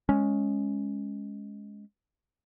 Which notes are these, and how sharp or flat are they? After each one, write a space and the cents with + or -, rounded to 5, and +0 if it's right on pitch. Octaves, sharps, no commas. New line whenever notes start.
G#3 +0 C#4 +0